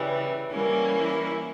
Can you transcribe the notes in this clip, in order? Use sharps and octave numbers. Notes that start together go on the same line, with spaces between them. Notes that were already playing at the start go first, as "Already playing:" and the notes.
Already playing: C#3 E3 G3
E3 G3 A#3 C#4
E4